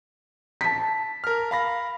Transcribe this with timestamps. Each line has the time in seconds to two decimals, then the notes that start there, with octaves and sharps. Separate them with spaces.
0.61 A5 B6
1.24 A#4 F6
1.51 F5 B5 A#6